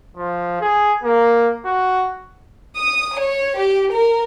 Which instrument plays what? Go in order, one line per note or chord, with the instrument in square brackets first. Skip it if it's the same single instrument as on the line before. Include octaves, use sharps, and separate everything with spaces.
[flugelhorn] F3
G#4
A#3
F#4
[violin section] D#6
C#5
G4
A#4